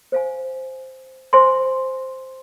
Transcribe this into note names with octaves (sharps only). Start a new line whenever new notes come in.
C5 F5 G#5
C5 E5 G#5 C6